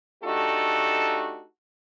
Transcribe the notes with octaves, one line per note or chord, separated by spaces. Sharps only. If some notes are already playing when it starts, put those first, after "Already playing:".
A3 D4 D#4 F#4 G4 A4